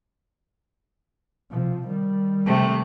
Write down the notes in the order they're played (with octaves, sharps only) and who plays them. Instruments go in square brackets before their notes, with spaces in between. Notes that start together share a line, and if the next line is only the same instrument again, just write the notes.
[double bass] C3 F3
D#3 G3
[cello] C3 A3